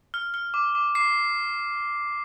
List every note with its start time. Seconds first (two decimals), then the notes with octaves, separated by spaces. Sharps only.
0.14 F6
0.34 F6
0.54 D6
0.75 D6
0.95 D6 C7